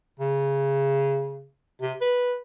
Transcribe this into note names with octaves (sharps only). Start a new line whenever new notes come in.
C#3
C3
B4